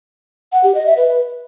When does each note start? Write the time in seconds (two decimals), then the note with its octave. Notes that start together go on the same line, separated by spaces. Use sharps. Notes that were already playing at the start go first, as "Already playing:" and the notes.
0.52 F#5
0.64 G4
0.75 D#5
0.86 E5
0.97 B4